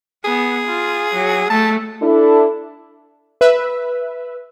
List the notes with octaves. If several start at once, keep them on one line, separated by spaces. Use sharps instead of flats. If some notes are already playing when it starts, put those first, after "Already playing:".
B3 G#4
F4
F#3
A3 A5
D4 E4 A4
B4 E5